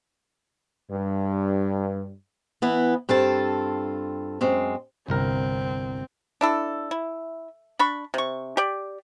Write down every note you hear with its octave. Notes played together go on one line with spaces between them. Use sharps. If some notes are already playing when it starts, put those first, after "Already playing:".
G2
E3 B3 E4
G2 C4 F4 A4 A5
F#2 G#3 C4
G1 C2 C4 A#4
D4 E4 A4
E4
D4 B5 C#6
C3 C#6
G4 D5